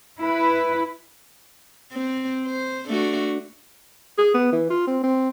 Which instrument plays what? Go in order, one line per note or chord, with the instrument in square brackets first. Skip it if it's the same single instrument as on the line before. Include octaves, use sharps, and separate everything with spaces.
[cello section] E4 B4
[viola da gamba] C4
C5
A3 D4 F#4
[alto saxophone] G#4
B3
E3
F4
C4
C4